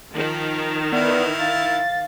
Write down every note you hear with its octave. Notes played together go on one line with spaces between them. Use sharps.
D#3 F3
B3 E4 D5 F6
F5 A6